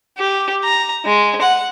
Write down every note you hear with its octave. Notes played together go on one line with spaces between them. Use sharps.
G4
A#5
G#3
F#5